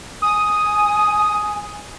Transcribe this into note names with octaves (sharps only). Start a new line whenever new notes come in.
G#5 D#6